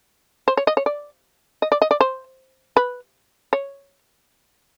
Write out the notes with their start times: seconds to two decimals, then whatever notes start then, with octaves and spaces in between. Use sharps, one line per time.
0.48 C5
0.57 C#5
0.67 D#5
0.77 C#5
0.86 D5
1.62 D#5
1.72 D5
1.82 D#5
1.91 D5
2.01 C5
2.77 B4
3.53 C#5